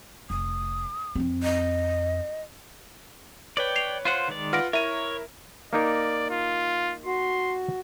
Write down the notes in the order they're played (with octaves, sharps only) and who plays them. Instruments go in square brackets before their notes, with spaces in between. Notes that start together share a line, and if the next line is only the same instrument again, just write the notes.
[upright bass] F1 [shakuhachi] D#6
[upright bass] F2 C4
[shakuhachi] D#5
[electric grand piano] B4 C#5 [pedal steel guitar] D5 G5
[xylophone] C7 F7
[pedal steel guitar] F4 C5 F#5
D#3 G#3 D5
[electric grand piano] F4 B4 F#5 [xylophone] F6 A#6 D7
[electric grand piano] E4 A#4 [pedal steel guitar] C#5 [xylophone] E5 D#7
[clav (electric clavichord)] A#3 D#4 A#4 [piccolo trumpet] D5
[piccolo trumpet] F4
[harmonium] F#4 [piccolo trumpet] C6